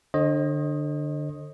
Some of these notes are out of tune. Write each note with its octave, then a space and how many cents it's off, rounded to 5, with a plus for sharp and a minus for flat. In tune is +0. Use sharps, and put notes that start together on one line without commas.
D3 +15 C5 +45 D#5 +0